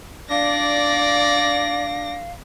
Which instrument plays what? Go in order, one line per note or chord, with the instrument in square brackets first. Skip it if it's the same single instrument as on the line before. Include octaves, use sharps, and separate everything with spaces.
[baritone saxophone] D4 [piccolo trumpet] D5 [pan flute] F5 [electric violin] A#6